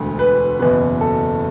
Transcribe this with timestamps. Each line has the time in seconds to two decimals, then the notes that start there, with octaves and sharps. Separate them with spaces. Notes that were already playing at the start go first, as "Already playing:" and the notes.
Already playing: E1 D2 D3 G#3
0.19 B4
0.59 F#1 E2 B2 B4
1.01 A4